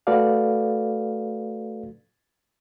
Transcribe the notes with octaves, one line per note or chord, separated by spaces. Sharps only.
A3 F#4 A4 B4 D5 F5